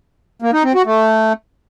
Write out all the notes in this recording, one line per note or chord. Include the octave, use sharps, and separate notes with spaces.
A#3
D#4
C4
F#4
A3